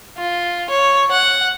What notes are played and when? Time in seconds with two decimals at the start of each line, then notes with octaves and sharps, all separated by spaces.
0.17 F4
0.70 C#5
1.11 F#5